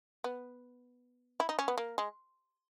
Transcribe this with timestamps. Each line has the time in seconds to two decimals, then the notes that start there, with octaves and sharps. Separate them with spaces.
0.24 B3
1.40 E4
1.49 D#4
1.59 C#4
1.68 B3
1.78 A#3
1.98 G#3